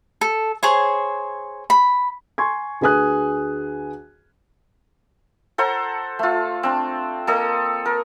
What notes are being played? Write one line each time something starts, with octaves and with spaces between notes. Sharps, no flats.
A4
G#4 C5 C#5
B5
G#5 C6 C#6 G#6
D2 G#4 B4 G#5 D#6 F#6
A4 C5 F#5 A#5
A3 F4
C4 D4
A#3 A4 D#5
A#4